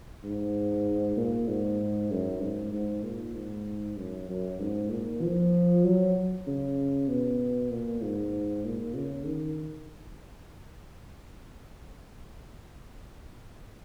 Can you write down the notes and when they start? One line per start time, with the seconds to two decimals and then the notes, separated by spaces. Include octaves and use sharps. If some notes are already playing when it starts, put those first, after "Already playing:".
0.24 G#2
1.17 A#2
1.48 G#2
2.11 F#2
2.41 G#2
2.73 G#2
3.04 A#2
3.35 G#2
3.98 F#2
4.29 F#2
4.60 G#2
4.91 A#2
5.22 F3
5.85 F#3
6.47 C#3
7.08 B2
7.71 A#2
8.02 G#2
8.65 A#2
8.96 C#3
9.26 D#3